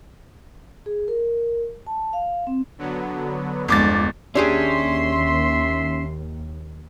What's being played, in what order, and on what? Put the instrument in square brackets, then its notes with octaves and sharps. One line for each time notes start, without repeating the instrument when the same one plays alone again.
[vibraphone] G#4
A#4
A5
F5
C4
[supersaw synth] D3 F#3 B3
[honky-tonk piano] G1 D6 A6 [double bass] E2 G#3 [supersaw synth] D3 F3
[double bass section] D#2 [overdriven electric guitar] C#4 [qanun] D4 G4 G#4 [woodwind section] E5 C6